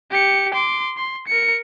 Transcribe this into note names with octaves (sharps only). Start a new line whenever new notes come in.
G4 C#7
C6 D6
C6
A#4 C#7